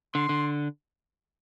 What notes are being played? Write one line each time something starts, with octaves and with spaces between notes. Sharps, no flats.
D3 C6
D3